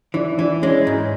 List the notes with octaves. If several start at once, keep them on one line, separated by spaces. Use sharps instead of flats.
E3 D4
E3 D4
G#3 C#4
G#2